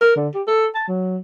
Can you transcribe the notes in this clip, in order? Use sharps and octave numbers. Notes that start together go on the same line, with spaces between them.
A#4
D3
G4
A4
A5
F#3